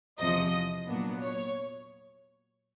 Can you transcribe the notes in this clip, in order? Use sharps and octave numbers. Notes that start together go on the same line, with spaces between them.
E2 C3 F3 D#5
A#2 F#3 B3 D4
C#5